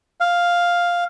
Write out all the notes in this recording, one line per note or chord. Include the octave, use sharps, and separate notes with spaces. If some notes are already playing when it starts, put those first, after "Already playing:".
F5